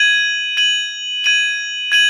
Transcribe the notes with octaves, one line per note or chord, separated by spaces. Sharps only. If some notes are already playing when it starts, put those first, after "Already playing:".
Already playing: G#6 D#7 F#7
G#6 D#7 F#7
G#6 D#7 F#7
G#6 D#7 F#7